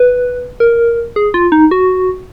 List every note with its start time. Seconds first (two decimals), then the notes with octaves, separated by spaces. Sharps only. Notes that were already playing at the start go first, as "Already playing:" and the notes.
Already playing: B4
0.60 A#4
1.16 G#4
1.34 F4
1.52 D#4
1.71 F#4